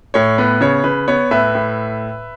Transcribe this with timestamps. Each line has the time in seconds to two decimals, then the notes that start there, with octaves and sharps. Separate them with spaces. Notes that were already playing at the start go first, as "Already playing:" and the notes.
0.14 A2 C#5
0.38 B3 B4
0.61 C#3 C#5
0.84 C#3 B4
1.08 B3 C#5
1.31 A2 B4 E5
1.55 A2